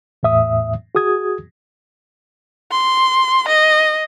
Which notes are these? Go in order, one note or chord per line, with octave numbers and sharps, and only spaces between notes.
E2 A2 E5 D#6
F#4 G#4 D#6 G#6
C6
D#5